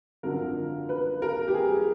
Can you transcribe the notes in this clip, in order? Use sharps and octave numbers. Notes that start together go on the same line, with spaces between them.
G#1 F#2 D3 F3 A#4
B4
A#4
G4
G#4